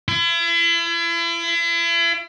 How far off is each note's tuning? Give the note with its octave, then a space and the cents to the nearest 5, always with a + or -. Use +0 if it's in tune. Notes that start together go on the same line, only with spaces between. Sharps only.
E4 +40